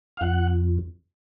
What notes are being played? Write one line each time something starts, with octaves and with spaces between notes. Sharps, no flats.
F5
F2 F#5